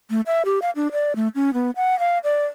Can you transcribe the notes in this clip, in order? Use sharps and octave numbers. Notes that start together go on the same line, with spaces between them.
A3
E5
G4
F5
D4
D5
A3
C#4
B3
F#5
F5
D5